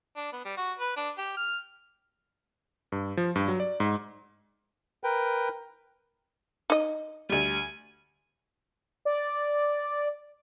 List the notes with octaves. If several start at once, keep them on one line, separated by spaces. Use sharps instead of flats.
D4
B3
G3
F#4
B4
D4
G4
F6
G2
F3
G2
F#3
D5
G#2
A#4 B4 G5
D#4 D#5
D2 G3 G#5
D5